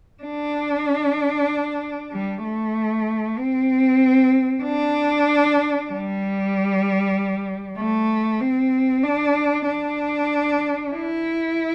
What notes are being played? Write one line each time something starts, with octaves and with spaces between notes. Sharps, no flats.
D4
G3
A3
C4
D4
G3
A3
C4
D4
D4
E4